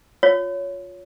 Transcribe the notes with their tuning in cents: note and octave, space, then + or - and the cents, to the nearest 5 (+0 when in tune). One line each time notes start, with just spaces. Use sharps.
F4 +25 C#5 +10